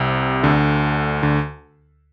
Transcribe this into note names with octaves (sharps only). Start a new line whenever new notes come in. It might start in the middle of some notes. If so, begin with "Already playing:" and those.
Already playing: C2 C3
D2 D3
D2 D3